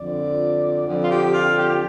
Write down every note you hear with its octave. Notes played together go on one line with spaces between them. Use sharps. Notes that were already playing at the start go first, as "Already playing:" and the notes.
Already playing: F2 D3 F3 D5
F2 D3 F3
F4
G4
F4
G4